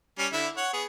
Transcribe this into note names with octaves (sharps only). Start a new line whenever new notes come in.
G3 C#4
D3 E4
C#5 F#5
B3 G#4